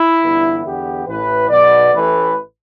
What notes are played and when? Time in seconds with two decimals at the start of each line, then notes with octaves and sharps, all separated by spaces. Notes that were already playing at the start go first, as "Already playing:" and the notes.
Already playing: E4
0.22 G1 G2 E3 B3
0.64 E2 D3 B3 G4
1.07 A1 A2 E3 B4
1.49 B1 B2 B3 D5
1.92 A1 A2 E3 A3 B4